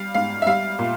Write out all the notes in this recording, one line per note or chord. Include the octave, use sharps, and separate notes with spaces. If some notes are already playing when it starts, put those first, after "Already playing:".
Already playing: G3 F5
G#2 F5
E5
G3 F5
A#2